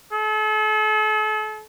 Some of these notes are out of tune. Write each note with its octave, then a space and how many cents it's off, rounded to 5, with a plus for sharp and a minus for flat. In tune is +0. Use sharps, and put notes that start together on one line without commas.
A4 -40